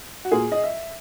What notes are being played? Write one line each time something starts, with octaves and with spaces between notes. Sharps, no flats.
F#4
A#2 G#4
D#5
E5